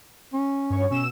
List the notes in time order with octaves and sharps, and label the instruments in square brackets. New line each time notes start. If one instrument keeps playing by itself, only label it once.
[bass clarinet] C#4
[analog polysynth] G2 C#5 C#6
[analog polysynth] B2 E6 E7 [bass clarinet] C#4